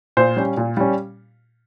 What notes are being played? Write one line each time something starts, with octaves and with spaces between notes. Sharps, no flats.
A#2 C5
G3 C#4
A#2
G3 C#4